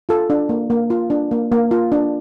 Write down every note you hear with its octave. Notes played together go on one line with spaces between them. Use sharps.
F4 A4
D4
A#3
A#3
F4
D4
A#3
A#3
F4
D4